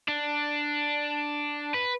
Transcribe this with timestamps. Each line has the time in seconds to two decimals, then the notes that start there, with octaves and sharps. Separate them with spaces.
0.08 D4
1.74 B4